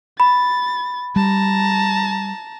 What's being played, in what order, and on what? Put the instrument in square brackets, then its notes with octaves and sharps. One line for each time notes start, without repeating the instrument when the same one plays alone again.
[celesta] B5 [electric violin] A6
[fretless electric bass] G3 [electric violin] A5 A#5